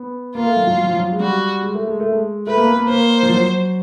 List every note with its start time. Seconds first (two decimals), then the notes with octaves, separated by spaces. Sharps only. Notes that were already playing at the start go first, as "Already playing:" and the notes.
Already playing: B3
0.35 A#3 F4
0.46 A3
0.57 F#3
0.67 F#3
0.78 F#3
0.87 F3
0.96 F#3
1.12 G#3
1.20 G3 F#4
1.62 G#3
1.74 A3
1.87 G#3
2.00 A3
2.12 G#3
2.47 A3 B4
2.57 A#3
2.68 B3
2.78 A#3
2.89 A#3 C5
3.23 F3
3.31 F#3